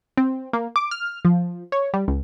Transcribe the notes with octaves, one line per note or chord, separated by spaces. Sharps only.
C4
A#3
D6
F6
F3
C#5
G3
C#2